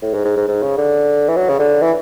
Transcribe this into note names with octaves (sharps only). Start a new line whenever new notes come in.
A2
G#2
G#2
G#2
G#2
C#3
D3
E3
F#3
C#3
D3
E3